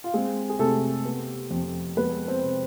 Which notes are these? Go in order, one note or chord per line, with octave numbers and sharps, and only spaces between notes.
F4
G#3 C4 G#4
G#4
C3 A3 A4
B3
F2
G#3 B3 B4
C4 C5
C3